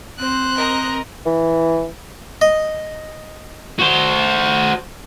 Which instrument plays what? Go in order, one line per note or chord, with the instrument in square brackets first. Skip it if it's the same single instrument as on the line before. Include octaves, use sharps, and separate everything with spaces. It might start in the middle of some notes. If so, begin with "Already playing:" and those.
[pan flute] C4 [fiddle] C5 F#6
[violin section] A#4 D#5 A#5
[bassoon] E3
[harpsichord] D#5
[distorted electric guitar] F#4 C5